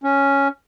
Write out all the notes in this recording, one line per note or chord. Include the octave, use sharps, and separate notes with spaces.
C#4